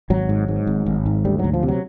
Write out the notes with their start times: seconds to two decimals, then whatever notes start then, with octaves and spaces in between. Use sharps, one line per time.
0.10 G#1 F#3
0.29 G#2
0.48 G#2
0.67 G#1
0.86 G#1
1.06 G#2
1.25 D2 G3
1.39 D2 F#3
1.54 F3
1.63 C3
1.68 F#3